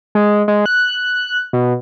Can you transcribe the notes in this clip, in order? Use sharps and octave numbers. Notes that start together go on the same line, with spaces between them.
G#3
G#3
F#6
B2